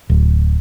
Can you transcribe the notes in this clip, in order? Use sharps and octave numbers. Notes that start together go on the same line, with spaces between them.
D1